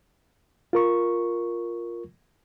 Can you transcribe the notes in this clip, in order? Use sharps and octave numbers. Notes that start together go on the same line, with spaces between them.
F4 A#4 C#6